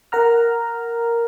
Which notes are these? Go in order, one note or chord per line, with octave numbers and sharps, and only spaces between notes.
A#4 F#5 A#5 F6